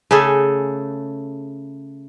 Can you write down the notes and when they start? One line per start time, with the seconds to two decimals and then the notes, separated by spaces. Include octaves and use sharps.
0.11 C#3 A3 G#4 A4